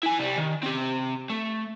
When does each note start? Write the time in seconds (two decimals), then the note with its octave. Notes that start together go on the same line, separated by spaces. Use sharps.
0.03 E4 G#5
0.18 C2 G3
0.38 D#3
0.63 C4 G4
1.30 A3